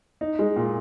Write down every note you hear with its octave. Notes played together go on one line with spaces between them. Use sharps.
D#4
G#3
A#2